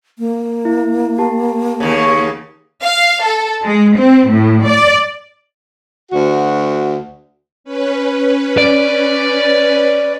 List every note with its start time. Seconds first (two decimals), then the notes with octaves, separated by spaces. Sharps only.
0.19 A#3
0.65 E4
1.18 G4 A5
1.80 D#2 C#3
2.82 F5
3.23 A4
3.64 G#3
3.97 C4
4.30 A2
4.68 D5
6.12 D2 F#4
7.64 C#4 B4
8.58 D5